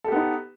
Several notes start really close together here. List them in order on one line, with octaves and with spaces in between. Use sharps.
A4 G4 B3 D#4